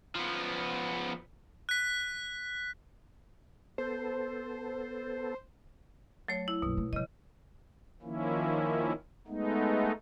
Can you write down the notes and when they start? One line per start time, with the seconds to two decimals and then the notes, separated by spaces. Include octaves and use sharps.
0.15 F3 B3
1.69 F#6 B6
3.78 B3 A4 C5
6.28 F#3 A3 C#5
6.48 E4
6.62 A#1 F#2 B2
6.77 A3
6.93 C#3 E3 G3 D#5
8.02 D#3 F3 A#3 C#4 E4
9.27 G#3 A3 B3 D#4